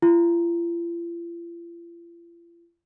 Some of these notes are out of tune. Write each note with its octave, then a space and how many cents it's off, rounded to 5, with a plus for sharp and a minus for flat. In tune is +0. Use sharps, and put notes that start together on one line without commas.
F4 -45